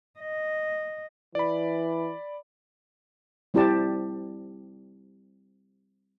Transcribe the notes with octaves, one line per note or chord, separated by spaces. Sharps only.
D#5
E3 D5 B5
G3 C4 E4 G4 D5 A5